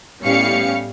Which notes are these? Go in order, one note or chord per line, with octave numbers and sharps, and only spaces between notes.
A2 G3 B3 C#4 F5 C#7